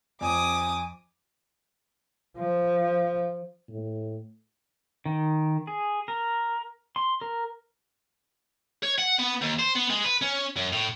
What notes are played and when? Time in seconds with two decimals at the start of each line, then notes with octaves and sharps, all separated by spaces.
0.21 F2 G#5 D6 D#6
2.37 F3
3.69 A2
5.06 D#3
5.67 G#4
6.08 A#4
6.96 C6
7.21 A#4
8.83 C#5
8.98 F#5
9.19 B3
9.41 D#2
9.59 C5
9.75 B3
9.90 G#3
10.04 B4
10.22 C#4
10.56 F#2
10.73 A2